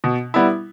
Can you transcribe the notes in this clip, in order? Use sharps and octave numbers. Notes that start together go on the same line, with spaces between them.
B2
G3 B3 E4